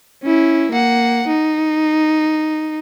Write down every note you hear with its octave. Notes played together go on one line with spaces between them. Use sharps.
C#4 E4
A#3 F#5
D#4